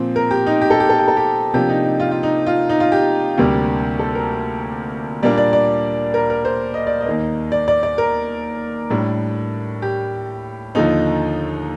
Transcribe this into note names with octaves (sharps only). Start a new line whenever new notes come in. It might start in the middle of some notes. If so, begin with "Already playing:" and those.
Already playing: A#2 F3 C4
A#4
G4
D#4
G4
A4
G4
A4
G4
A4
G4
C3 F3 A#3 D4 G4
D#4
D#4
F4
F4
D#4
F4
D#4
F4
G4
D2 C3 G3 A#3 D4
A4
A#4
A#2 G3 A#3 D4 D5
D5
D5
A#4
A#4
C5
D#5
D5
D#5
D#2 D#3 A#3
D5
D5
D5
A#4
A2 G3 D4
G4
D#2 D3 F3 D#4